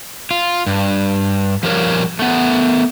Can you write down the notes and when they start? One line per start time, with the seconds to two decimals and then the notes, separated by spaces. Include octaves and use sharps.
0.31 F4
0.66 G2
1.63 F3 G3 A#4 C#5
2.19 A3 B3